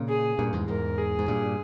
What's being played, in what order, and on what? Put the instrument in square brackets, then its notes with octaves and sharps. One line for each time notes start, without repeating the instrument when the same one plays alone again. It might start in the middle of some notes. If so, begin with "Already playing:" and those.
Already playing: [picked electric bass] A#2 C#3
[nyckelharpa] G#4
[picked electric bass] G2 A#2
E2 G#2
[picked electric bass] E2 G#2 [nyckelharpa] A#4
[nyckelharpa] G#4
[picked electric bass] G#2
G2 A#2